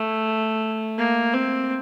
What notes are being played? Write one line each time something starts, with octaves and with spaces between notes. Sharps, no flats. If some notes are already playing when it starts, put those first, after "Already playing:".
Already playing: A3
A#3
C4